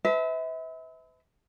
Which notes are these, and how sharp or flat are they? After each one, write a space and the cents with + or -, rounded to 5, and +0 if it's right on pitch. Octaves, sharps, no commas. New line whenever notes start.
B4 +35 E5 -35 A5 +0